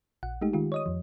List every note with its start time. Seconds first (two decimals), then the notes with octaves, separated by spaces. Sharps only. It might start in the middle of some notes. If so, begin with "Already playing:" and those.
0.23 A#1 F#5
0.41 G#3 A3 D#4 G4
0.53 D#3 G#3 F4 G4
0.72 C#5 D#5 D#6
0.86 F2 F3